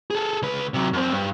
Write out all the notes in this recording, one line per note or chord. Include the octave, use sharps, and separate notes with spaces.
G#4 A4
C#2 B4
C3 F#3
F#2 C4
G2